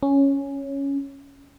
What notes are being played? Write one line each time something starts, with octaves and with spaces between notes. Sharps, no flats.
C#4